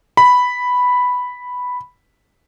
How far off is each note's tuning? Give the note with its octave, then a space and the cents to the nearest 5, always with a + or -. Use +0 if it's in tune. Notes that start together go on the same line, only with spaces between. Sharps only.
B5 +0